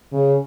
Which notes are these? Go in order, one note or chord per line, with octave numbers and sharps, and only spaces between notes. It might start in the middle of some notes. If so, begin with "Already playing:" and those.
C#3